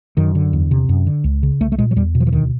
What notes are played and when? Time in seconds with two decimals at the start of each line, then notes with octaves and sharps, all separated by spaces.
0.17 F#2 D#3
0.35 D3
0.53 E2
0.71 C3
0.89 F#2
1.07 D3
1.24 C#2
1.43 C#3
1.60 C2 A3
1.72 A3
1.78 A#2 G#3
1.91 F#3
1.96 E2 G3
2.15 B2
2.20 F3
2.27 E3
2.32 D2 D#3